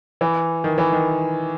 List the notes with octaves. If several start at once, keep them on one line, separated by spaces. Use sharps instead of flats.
E3
D#3
E3
D#3